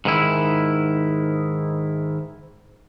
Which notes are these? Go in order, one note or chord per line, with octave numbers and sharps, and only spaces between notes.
G#2 D#3 E4